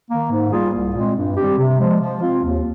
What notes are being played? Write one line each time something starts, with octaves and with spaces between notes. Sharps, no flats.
D#3 A#3
G#2
G3 A#3 F4 G#4
C2
A#2 G#3 C4
G2
D#3 G3 C4 G4
C3
F3 G#3
F3
C4 F4
D#2